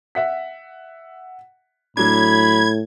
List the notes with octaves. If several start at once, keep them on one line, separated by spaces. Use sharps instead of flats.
E5 F#5 B6
A2 F#3 D4 B5 G#6